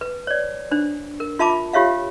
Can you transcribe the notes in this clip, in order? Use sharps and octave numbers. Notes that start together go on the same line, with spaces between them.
B4
C#5 D5
D4 C5
A#4
F4 E5 A5 B5 D6
F4 G4 C#5 E5 F5